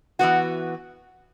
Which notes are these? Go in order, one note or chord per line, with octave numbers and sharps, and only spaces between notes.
E3 B3 F#4 F#5